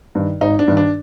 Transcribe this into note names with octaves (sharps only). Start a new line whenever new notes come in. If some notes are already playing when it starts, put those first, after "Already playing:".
G2 D#3
G#1 D#4
D4
G2 D#3
D4